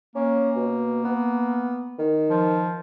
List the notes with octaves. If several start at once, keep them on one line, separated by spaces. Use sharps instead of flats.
A#3 C#4
B2
B3
D#3
F3